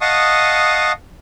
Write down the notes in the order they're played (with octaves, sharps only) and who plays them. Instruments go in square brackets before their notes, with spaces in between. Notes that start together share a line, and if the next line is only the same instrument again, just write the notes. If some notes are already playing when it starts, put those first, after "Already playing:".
[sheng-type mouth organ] D#5 F5 F#5 A5 C#6 D#6